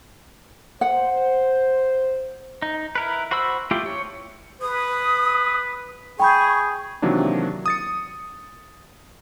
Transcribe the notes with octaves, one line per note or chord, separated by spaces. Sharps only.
C5 F#5
D#4
E4 A#4 B4
F#4 C5 B5 E6
A3 E4 F4 G4
C#5
B4 D#6
G#4 G5 B5 C#6 G6
C3 D#3 E3 F#3 A#3 D4
D#6 A6 C#7